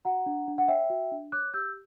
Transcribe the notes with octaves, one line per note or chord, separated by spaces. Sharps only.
F#4 F#5 A#5
D4
D4
F#5
C#5 E5 G5
F#4
D4
C#5 D6 F#6
G4 E6 G6